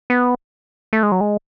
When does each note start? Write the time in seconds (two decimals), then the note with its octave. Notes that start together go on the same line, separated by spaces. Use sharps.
0.10 B3
0.93 A3
1.03 G#3
1.12 F#3
1.21 G#3